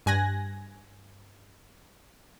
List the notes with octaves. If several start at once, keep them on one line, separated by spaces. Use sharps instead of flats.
G2 G#5 F#6 A#6